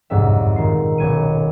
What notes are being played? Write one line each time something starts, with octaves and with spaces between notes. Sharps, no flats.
G1 C2 F2 G#2 F#3 E5
A#2 D#3 C7
D#1 B1 G#6 C#7 D#7